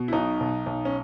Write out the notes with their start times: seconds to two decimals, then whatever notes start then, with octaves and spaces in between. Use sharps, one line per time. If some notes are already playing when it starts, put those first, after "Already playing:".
Already playing: B2
0.08 E4
0.12 B1 D#4
0.41 B1
0.66 B1
0.85 C#4